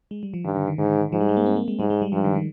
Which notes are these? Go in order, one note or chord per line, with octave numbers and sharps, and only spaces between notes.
G#3
G3
F3
G2 D#3
D3
D#3
G#2 D3
D#3
G#2 F3
G3
G#3
A#3
C4
A#3
G#3
G#2 G3
G#3
G3
G2 F3
D#3
D#3